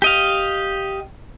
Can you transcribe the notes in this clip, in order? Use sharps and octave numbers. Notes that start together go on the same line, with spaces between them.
G4 D#5 F5